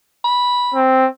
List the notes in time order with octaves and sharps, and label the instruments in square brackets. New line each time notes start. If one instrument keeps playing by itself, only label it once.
[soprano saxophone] B5
[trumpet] C4